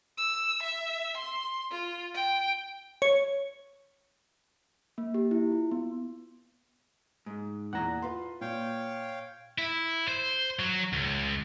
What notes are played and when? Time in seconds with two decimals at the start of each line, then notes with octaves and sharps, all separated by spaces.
0.18 E6
0.63 E5
1.17 C6
1.71 F4
2.14 G5
3.02 C#5
4.98 A#3
5.14 G4
5.31 E4
5.52 F4
5.71 B3
7.26 G#2
7.73 E2 A#2 F#5 A#5
8.02 F4 B4 C6
8.41 A#2 C#5 F5 G5
9.58 E4
10.08 C5
10.59 F#3
10.93 C#2